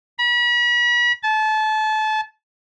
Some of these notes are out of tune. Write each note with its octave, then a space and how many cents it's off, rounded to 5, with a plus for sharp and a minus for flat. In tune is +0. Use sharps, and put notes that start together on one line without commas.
B5 -40
A5 -30